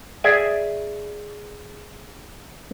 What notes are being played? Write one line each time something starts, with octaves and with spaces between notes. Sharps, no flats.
G#4 D5 E5 G#5